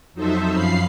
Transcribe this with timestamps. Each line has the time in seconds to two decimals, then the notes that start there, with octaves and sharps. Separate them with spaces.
0.13 F2 F#3 D#4 A4 C5 E5
0.50 F#2 F3 F5 B5 C7